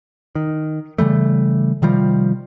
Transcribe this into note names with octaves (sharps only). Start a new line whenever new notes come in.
D#3
C#3 E3 G3 A3
C3 D#3 F3 G3